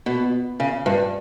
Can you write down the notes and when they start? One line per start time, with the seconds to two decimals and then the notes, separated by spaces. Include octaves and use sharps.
0.06 B2
0.60 C#3
0.86 G2